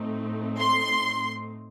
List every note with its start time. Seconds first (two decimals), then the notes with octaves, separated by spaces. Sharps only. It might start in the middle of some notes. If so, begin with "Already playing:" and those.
Already playing: A2 A3 C4 D#4
0.59 C6